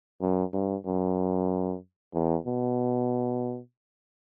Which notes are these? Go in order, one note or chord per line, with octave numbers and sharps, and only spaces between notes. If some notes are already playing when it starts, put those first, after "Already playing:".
F#2
G2
F#2
E2
B2